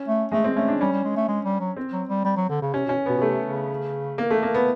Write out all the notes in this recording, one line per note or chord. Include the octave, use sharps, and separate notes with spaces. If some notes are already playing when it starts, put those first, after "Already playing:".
Already playing: C#4
A3
G#3 A3
C4
A3 C#4
D4
G3 C#4
G3
G#3
A3
G#3
G3
F#3
C4
F#3
G3
G3
F#3
D3
C#3
C3 C#4
B2 C#4
B2 B3
B2
C3 A3
C#3
A#3
A3
A#3
B3